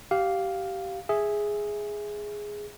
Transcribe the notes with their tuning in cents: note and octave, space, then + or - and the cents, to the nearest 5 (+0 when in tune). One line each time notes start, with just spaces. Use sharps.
G4 -20 F5 +0
G#4 +0 E5 +0